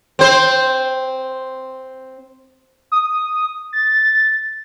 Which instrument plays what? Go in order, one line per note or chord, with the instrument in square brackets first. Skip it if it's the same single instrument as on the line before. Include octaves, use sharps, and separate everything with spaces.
[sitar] C4 C5
[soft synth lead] D#6
A6